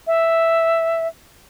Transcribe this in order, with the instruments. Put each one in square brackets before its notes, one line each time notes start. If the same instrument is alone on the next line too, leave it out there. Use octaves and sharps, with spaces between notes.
[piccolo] E5